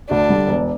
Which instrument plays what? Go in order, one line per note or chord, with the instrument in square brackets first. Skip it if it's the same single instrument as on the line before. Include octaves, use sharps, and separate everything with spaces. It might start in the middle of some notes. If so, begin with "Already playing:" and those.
[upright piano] D2 [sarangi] D4
[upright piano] D3 G3
E1